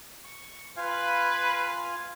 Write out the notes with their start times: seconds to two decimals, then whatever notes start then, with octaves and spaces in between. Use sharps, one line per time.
0.24 C#6
0.77 F4 B4 F5 G#5